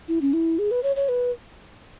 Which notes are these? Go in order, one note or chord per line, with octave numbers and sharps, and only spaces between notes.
E4
C#4
E4
G#4
B4
C#5
C#5
B4